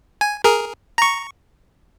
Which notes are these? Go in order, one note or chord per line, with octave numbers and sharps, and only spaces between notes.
G#5
G#4 A#4
A#5 C#6